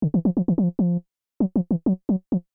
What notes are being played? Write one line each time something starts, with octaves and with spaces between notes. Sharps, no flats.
D3
E3
F3
F3
E3
F#3
F3
F3
F#3
F3
E3
F#3
F#3
F3